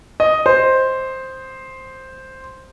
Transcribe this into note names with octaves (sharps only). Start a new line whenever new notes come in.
D#5
C5